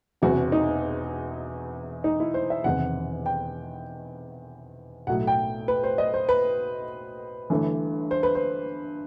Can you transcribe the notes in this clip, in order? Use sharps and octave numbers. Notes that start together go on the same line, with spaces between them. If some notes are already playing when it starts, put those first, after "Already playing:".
E1 E2 C3 F#4
D#4
D#4
E4
C5
E5
E1 E2 C3 D#3 F#5
G5
B1 A2 F#3 A3 F#5
G5
B4
C5
D#5
C5
B4
G1 G2 E3 A3
C5
B4
C5